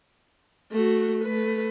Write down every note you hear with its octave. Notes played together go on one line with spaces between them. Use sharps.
A3 F#4
A3 B4